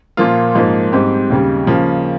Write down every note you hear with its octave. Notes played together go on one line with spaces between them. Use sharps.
A#2 F3 A#3 F4
G#2 F3 A#3
G#2 G3 C4 G4
D#2 C#3 G3
C#3 F3 A#3